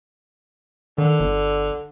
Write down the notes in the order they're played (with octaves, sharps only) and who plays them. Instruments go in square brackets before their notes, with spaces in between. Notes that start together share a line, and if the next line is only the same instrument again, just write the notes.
[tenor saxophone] D3 [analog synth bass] D#3
[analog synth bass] G1